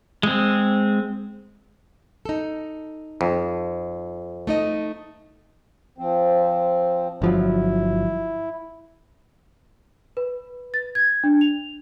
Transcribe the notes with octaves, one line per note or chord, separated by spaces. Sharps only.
G#3 C4
D#4 A4
F2
A3 D#4 D#5
F3 C4
G1 F3 F#3 E4
B4
A6
G#6
D4
F7